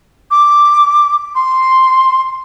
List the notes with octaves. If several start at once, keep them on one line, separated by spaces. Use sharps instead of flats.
D6
C6